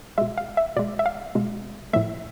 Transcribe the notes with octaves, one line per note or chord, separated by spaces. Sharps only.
B2 G#3 E5
F5
E5
B2 G#3 D5
E5
F5
B2 G#3
A2 F3 A3 E5